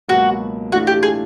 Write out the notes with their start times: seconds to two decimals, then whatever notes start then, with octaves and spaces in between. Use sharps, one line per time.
0.08 C#2 B2 F#3 A#3 F#4
0.72 A2 E3 A3 D4 F4 F#4
0.87 G4
1.03 G#4